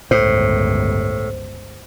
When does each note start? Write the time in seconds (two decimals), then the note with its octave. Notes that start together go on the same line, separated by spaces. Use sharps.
0.11 G1 C#2 A2 C5